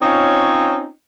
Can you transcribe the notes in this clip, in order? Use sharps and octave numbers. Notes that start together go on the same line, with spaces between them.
C4 C#4 D#4 F4 C#5